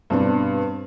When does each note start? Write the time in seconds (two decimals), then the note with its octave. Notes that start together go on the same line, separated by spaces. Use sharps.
0.10 G2 B2 C4 D4